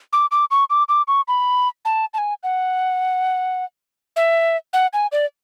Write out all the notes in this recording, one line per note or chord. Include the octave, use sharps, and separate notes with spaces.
D6
D6
C#6
D6
D6
C#6
B5
A5
A5
G#5
F#5
E5
F#5
G#5
D5